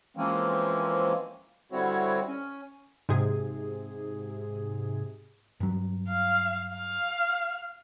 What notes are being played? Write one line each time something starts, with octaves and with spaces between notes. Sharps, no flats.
E3 F3 G#3 A#3 C4 C#4
D3 G3 C4 E4 F#4 C#5
C#4
G#2 C3 G#4
G2 F#3
F5
F5